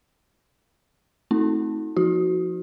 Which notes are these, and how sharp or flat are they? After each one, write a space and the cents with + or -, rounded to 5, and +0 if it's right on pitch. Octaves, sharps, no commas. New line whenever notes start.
A3 +0 C4 +0 D#4 +40
F3 +0 D#4 +40 F#4 +0